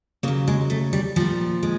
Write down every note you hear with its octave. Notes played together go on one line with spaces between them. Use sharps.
C#3 F#3 A#3
G#3
A3
G3
A#2 F3 G3
G#3